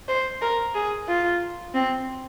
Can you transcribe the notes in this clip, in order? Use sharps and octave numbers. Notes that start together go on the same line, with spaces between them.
C5
A#4
G#4
F4
C4